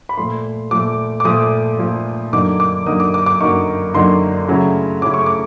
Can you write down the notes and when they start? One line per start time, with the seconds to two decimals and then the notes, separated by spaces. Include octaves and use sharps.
0.09 B5
0.17 A#2 F3 A3 C6
0.71 A#2 F3 A3 D6
1.20 D6
1.25 A#2 F3 A3 D#6
1.79 A#2 F3 A3
2.33 F#2 D3 F#3 A#3 D#4 D6
2.60 D6
2.86 F#2 D3 F#3 A#3 D#4 D#6
3.00 D6
3.14 D6
3.26 D6
3.41 F#2 D3 F#3 A#3 D#4 C#6
3.94 F#2 D3 F#3 A#3 D#4 C6
4.48 C#3 F#3 A3 C#4 E4
5.02 C#3 F#3 A3 C#4 E4 D6
5.14 C#6
5.26 D6